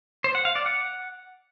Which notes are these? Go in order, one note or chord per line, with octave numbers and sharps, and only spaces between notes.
C5
F#5
F5
D5
F#5